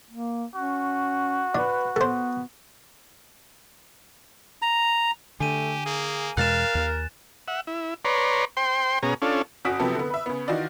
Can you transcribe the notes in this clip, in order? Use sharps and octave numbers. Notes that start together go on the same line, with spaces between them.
A#3
C#4 F#4
D4 B4
B3 A4 C5
A#5
D3 A3 G4 G#5 D#7
A#3 G#4
E2 B2 G#3 A#4 F5 F#6 A6 E7
D#2
E5 F#5
E4
B4 C#5 D5 A#5 C6
C5 G5 C6
B2 C#4 G#4 A#5
C#4 D4 F4 A4
G1 C#4 F#4 D#6 B6 D7
C3 F3 F#3 B3 G4 A4
D3 B3
B4 E5
C#3 B3
D#3 E3 D#4 F4 F#4 D5